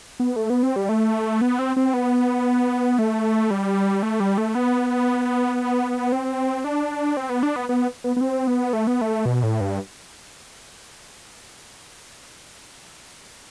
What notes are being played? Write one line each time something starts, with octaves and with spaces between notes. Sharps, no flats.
B3
A3
B3
C4
G3
A3
B3
C4
C4
B3
A3
G3
A3
G3
A3
B3
C4
D4
C4
B3
D4
B3
B3
B3
B3
C4
B3
A3
B3
A3
B2
A2
G2